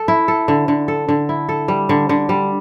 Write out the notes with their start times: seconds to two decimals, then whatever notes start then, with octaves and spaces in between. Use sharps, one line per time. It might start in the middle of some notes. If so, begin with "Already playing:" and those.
Already playing: A4
0.08 E4
0.28 A4
0.48 D3
0.68 D3
0.88 A4
1.08 D3
1.29 E4
1.49 A4
1.68 G3
1.89 D3
2.09 D3
2.29 G3